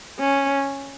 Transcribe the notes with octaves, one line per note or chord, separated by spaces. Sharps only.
C#4